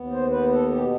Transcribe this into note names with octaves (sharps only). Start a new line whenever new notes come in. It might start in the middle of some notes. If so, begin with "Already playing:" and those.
Already playing: D#2 B3
C5
B3 B4
A4
B2 G4